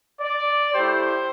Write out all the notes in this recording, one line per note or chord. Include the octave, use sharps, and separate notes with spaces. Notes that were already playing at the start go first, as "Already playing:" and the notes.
D5
A3 E4 G4 C5